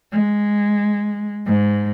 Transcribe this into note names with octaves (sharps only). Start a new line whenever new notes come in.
G#3
G#2